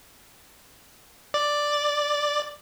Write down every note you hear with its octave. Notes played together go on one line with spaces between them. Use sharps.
D5